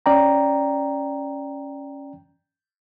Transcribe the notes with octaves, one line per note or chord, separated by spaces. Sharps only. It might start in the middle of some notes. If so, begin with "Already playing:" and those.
C#4 D5 G5 A#5